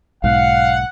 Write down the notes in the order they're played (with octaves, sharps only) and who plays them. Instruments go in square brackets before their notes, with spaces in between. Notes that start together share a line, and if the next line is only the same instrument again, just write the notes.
[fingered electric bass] B1 G#2 [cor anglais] F5 [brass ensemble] F#5